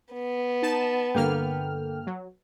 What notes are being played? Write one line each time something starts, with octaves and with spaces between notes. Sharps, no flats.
B3
D#4 A5 E7
G2 D3 A#3 A4 G5 F6
F#3